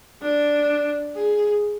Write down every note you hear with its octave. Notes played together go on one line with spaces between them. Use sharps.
D4
G#4